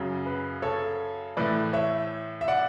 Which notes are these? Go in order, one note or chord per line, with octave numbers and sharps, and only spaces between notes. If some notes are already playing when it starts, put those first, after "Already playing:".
Already playing: F#2 C#3 F#3
B4
A4 C#5
A2 E3 A3 B4 D5
C#5 E5
E5
D5 F#5